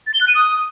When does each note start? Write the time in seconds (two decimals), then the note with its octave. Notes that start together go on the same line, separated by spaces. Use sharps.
0.07 A6
0.14 G7
0.21 F#6
0.28 D#7
0.35 D#6